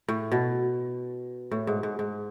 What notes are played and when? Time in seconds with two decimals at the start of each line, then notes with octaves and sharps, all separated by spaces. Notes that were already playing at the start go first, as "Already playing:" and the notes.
0.08 A2
0.32 B2
1.51 A2
1.67 G#2
1.83 G#2
1.99 G#2